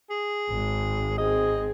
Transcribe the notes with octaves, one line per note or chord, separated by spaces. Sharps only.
G#4
G#1
C4 G#4 D#5